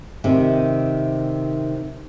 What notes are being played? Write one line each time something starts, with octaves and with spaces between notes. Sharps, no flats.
C3 D#3